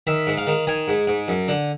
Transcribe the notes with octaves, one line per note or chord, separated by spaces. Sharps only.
D#3 E5
G#2
F5
D#3
D#3 G#5
G#2
G#2
F#2
D3